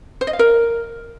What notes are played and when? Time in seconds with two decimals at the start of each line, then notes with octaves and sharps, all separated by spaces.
0.21 C5
0.27 D#5
0.33 F5
0.39 A#4